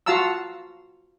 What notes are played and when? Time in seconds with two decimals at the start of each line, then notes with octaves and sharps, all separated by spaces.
0.06 F4 F#4 F5 A5 A#5 E6